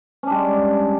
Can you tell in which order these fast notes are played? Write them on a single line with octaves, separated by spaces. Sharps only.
C#4 D4 G3 G#3